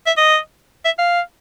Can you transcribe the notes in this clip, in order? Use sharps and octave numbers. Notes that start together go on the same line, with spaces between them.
E5
D#5
E5
F5